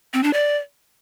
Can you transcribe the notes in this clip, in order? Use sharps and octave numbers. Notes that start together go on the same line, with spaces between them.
C4
D4
D5